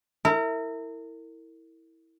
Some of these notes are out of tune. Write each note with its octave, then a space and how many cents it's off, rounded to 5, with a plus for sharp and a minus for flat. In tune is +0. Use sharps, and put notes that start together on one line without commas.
E4 -10 A#4 -35